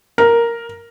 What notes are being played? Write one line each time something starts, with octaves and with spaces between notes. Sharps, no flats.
A#4